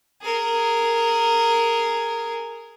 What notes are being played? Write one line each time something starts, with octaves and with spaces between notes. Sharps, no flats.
G#4 A#4